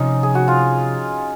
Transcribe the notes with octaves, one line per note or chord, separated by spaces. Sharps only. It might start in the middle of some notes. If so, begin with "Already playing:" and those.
Already playing: C3 F3 C#4 D#4
G#4
F#4
F4